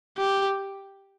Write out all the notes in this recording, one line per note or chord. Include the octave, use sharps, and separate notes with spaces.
G4